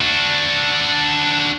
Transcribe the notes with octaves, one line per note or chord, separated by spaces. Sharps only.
D4 F#4